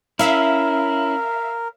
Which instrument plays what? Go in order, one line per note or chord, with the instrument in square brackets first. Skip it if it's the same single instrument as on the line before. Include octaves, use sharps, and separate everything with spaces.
[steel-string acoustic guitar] C#4 [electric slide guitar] E4 [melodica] A#4 [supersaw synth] E5 F5